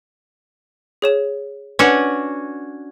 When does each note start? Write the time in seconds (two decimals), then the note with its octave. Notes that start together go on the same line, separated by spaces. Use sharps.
1.02 G#4 C#5 E7
1.79 C#4 D4 F#4 B4 F#5